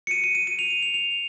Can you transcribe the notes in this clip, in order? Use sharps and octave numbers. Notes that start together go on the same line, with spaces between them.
C#7
D#7
D#7
D#7
D#7
F7
D#7
F7
F7